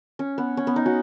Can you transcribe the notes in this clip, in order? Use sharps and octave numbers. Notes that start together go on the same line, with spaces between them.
C#4
B3
C#4
B3
D#4
C#4 F#4